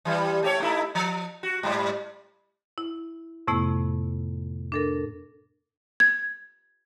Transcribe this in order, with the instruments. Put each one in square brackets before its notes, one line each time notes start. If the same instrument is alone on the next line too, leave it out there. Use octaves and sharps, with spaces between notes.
[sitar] E3 G3
A3 G4 C#5
A3 D#4 E4
F3
F#4
G#2 G3
[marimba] E4
F2 A2 C3 A3 B3 E4
D4 A4 A#4
[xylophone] G#6